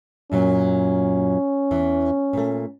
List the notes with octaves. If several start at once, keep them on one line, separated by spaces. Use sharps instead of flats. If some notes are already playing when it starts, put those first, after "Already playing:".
F#2 A#2 F#3 C#4
E2 E3
A#2 A3